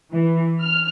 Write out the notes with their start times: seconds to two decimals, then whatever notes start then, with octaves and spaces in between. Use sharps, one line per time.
0.12 E3
0.59 F6